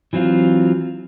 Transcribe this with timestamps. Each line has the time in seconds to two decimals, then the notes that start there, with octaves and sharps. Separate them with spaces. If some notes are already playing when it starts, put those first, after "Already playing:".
0.13 E3 F#3 C4 D4 F4